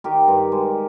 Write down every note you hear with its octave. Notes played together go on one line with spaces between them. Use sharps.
D#3 G4 A#4
G2
G#3